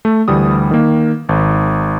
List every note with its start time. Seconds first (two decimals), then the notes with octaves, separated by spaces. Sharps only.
0.05 A3
0.28 D2 E3 G3 D#6
0.71 D#3 A#3
1.29 G#1